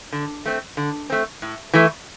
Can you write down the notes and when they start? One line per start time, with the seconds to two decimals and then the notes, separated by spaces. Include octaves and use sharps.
0.12 D3
0.46 A3 C4
0.77 D3
1.10 A3 C4
1.42 A2
1.73 E3 A3